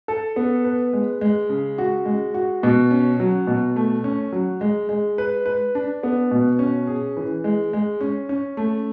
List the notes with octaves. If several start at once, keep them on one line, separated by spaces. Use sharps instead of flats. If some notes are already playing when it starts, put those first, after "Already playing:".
A4
B3
B4
G#3
G#3
C#3
F#4
G#3
F#4
B2
C#4
F#3
B2
A3
C#4
F#3
G#3
G#3
B4
B4
D4
B3
B2
C#4
G#4
E3
G#3
G#3
C#4
C#4
A3